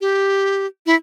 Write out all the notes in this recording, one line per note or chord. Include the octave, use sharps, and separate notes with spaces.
G4
E4